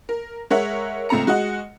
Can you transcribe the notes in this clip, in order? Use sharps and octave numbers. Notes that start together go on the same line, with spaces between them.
A#4
G#3 A#4 C#5 E5 F#5
C#2 A3 C4 A#5 C#7
G#3 F#4 D#5 F#5